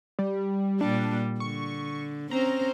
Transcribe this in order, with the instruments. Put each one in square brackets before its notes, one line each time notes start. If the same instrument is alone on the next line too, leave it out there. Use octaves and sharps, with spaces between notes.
[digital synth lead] G3
[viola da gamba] A#2 G3 [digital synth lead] D4
[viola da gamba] D3 [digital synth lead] C#6
[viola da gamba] C4 C#4 C5 [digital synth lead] A#5